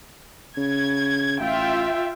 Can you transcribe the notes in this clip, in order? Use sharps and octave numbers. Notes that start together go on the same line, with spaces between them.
C#3 G#6
A1 F4 E5 G5